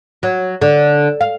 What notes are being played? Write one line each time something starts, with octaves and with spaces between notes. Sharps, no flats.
F#3
D3
F5